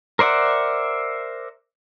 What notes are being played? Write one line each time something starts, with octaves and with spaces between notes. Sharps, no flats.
A#4 C5 D5 E5 F#5